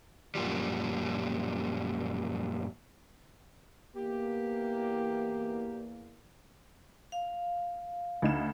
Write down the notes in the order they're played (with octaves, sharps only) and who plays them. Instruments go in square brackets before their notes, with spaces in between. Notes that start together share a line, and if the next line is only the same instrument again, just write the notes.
[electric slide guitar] F#2 A#2 F3 G3
[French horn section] E2 A#3 [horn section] G4
[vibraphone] F5
[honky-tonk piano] D2 D#4 E7